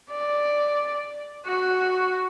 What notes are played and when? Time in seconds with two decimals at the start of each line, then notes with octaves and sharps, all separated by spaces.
0.11 D5
1.46 F#4